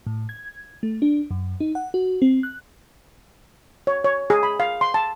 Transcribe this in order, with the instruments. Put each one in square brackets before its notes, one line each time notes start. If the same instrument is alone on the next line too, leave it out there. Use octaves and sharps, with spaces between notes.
[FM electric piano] A2
G#6
A3
D4
F#2
D#4
F#5
F#4
C4
F#6
[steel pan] C#5
C#5
G#4
B5
F5
C6
A5